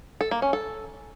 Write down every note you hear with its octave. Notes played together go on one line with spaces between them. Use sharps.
A4
A#3
C#4
A4